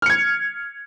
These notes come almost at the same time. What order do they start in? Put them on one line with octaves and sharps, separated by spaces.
F6 C#7 G#6